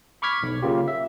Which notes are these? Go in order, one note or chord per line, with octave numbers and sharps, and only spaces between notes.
B5 C#6 D6 F6 G#6 B6
B1
C#3 A#3 F4 G4
E5